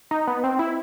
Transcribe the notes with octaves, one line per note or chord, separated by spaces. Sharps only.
D#4
B3
C4
E4